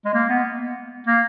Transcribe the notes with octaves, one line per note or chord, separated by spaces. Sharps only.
G#3
A#3
B3
A#3